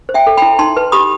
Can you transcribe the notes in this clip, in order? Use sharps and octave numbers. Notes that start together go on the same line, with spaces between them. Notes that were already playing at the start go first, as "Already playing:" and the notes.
C5
E5 G5
A4
E4 G5 B5
D#4 A5 C6
B4
G4 B5 D#6